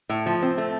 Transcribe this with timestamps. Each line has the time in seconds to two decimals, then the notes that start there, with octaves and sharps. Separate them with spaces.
0.09 A2
0.26 F3
0.42 C4
0.58 A3